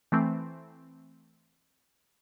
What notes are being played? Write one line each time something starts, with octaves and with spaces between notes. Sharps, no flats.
E3 A3 C4